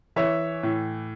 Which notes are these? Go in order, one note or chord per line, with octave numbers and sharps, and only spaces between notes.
E3 C#5 E5
A2